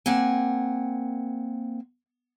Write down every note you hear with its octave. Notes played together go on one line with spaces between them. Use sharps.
A#3 C4 F#5 G#5